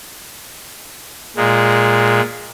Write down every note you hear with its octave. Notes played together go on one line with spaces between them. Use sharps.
A#2 G#3